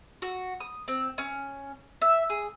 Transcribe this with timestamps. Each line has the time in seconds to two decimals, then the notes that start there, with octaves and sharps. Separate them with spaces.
0.22 F#4
0.60 D#6
0.88 C4
1.18 C#4
2.02 E5
2.30 G#4